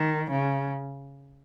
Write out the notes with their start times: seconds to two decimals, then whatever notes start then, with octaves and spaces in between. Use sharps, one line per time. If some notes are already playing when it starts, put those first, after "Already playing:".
Already playing: D#3
0.31 C#3